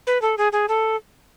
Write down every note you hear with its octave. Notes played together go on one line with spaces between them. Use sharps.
B4
A4
G#4
G#4
A4